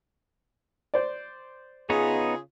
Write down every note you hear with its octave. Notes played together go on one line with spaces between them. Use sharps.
C5 D5
C#3 B3 D#4 F4 G#4 C#5